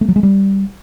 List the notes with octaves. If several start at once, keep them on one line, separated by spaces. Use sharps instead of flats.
A3
F#3
G#3
G3